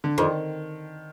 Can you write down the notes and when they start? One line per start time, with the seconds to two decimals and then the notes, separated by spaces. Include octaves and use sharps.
0.04 D3
0.18 F2 D#3